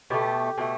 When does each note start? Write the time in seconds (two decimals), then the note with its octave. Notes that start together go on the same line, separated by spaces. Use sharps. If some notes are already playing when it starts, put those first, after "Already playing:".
0.10 B2 A3 G4
0.58 B2 A3